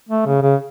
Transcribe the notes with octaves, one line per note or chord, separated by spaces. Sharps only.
A3
C#3
C#3